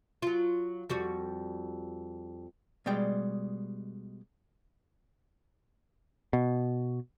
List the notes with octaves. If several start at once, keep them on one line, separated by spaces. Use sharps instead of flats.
F#3 F4
F2 G3 F#4
B2 G3 G#3 D5 G5
B2